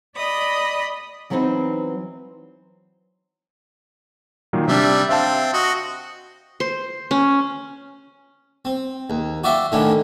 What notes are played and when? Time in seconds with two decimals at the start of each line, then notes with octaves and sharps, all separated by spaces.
0.16 D5 D#5 B5 D#6
1.30 E3 F#3 B3 C4 D#4
4.53 A#2 D#3 F#3
4.68 C3 G3 D4 E5
5.09 C4 E5 F5 A5
5.53 F#4 D#5
6.60 C5
7.11 C#4
8.65 C4
9.10 D#2
9.44 F#4 D5 E5 F5 G5
9.72 A2 D3 D#3 C#4 D4